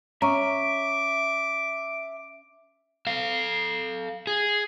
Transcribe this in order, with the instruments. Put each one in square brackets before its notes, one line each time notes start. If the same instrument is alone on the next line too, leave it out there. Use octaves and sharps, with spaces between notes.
[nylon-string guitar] C#4 [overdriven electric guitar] E5 [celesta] A#5 C#6 [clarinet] D6
[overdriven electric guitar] A4 F5
G#4